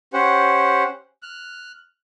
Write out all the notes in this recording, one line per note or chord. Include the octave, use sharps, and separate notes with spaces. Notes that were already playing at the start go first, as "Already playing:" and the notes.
C#4 G4 C5 F#5
F6 F#6